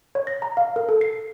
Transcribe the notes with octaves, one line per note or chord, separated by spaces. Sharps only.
C#5
A#6
A#5
F5
A#4
A4
C7